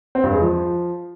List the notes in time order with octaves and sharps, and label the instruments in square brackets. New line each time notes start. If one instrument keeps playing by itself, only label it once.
[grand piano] C4
G2
G#3
F3